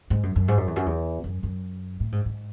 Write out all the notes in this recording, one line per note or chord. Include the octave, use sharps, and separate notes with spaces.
G#2
F#2
F#2
G#2
F#2
E2
F#2
E2
F#2
F#2
A2
G#2
G#2